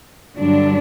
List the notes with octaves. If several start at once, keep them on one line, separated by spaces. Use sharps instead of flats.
G2 D3 F#3 D4